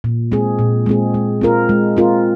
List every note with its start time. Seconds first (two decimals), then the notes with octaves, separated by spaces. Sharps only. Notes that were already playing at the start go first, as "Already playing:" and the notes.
0.04 A#2
0.32 G#3 C4 G#4
0.59 A#2
0.86 G#3 C4 G#4
1.14 G#3
1.41 C4 F4 A#4
1.69 G#3
1.97 C4 F4 A#4